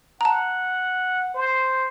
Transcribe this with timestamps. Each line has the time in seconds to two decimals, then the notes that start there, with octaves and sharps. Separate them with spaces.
0.21 F#5 A5 A#5
1.34 C5